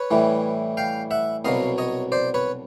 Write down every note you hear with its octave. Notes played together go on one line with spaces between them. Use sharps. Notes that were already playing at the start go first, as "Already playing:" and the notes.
Already playing: B4 C#5
A2 E3 G3
F5 G5
E5 F#5
C2 B2 F#3 D#5 F5
C#5 D#5
C5 D5
B4 C#5